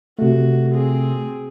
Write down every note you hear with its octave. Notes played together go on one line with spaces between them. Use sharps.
C3 A3 F#4
C4 G#4